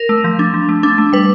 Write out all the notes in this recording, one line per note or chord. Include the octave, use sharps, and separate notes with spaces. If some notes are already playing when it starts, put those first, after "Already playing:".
Already playing: A#4
A3
F3
D4
F3
A3
D4
A3
G3 B4